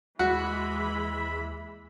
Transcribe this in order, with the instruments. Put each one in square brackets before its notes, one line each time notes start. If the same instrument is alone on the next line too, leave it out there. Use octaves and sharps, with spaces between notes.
[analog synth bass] D#2 [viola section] E3 G#3 B5 [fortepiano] F#4 [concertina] E5